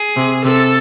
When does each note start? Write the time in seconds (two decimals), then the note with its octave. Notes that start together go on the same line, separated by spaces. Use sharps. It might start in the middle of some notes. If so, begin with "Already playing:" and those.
Already playing: G#4
0.16 C3
0.44 C3 A4